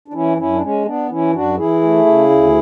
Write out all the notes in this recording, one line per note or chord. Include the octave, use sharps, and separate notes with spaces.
D4
E3 C#4 E4
F#2 C#4 E4
D4
G#3 C#4
B3 D4
E3 C#4 E4
F#2 D4 F#4
E3 E4 G#4
A3
C#3
D2